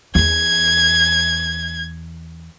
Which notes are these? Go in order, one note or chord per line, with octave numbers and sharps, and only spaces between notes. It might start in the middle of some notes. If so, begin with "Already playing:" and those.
E2 G#6